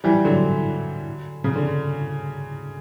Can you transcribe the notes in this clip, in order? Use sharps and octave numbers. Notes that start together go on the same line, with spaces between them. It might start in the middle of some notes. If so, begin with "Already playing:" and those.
E3 G3
D3 F#3
C#3
D3